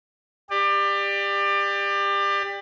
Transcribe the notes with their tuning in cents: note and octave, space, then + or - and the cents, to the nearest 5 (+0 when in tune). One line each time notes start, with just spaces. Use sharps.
G4 +25 D5 +25